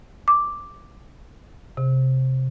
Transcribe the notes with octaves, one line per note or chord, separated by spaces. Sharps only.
D6
C3